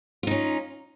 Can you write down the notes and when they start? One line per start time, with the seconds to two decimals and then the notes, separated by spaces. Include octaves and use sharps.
0.23 F4
0.27 D#4
0.31 C#4